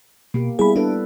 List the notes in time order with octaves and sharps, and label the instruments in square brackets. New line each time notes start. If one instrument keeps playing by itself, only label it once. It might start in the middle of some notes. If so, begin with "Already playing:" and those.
[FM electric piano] B2 [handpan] A#3 G4
[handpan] G3 B3 E4 [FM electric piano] G#4 B5
[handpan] B3 A4 B4 [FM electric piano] D4